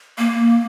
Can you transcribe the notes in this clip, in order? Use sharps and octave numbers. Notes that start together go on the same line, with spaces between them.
A#3